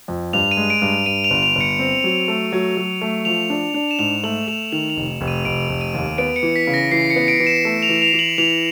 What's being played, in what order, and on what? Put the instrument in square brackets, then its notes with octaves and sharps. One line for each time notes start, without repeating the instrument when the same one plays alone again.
[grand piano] F2
[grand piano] G2 [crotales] F7
[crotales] D#7
[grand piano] G#3
[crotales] D7
[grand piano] G2
[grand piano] G2 [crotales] D#7
[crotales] F7
[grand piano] G1
[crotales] F7
[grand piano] G1
[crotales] C#7
[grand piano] C4
F#3
A3
F#3
F#3
A3
[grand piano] F3 [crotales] F7
[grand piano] D4
D4
[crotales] E7
[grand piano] G#2 [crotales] F7
[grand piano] A3 [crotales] F#7
[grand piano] A3 [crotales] F7
[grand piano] D#3 [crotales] F7
[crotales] F7
[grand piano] F1
F1
[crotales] D#7
[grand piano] F1 [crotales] D7
[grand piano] F1
[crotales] D#7
[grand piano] D#2
[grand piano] B3 [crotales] D7
[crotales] C#7
[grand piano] E3
[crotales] B6
[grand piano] C#3
[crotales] A#6
[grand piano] E3 [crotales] C7
[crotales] C#7
[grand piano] B3
[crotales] D7
[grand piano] E3
[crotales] E7
[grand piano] A3
[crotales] F7
[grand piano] E3
[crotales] F7
[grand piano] E3
[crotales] F#7
[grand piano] E3 [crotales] F7